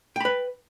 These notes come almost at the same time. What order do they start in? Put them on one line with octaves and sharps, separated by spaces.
G5 B5 B4